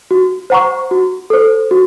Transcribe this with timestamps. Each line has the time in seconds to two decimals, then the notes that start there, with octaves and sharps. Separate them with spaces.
0.11 F#4
0.50 C5 F#5 A#5 C#6
0.91 F#4
1.30 A4 C5
1.71 F#4